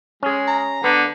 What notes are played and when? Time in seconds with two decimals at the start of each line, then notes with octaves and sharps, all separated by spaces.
0.23 G#3 C#4 G#4
0.48 A#5
0.84 D3 B3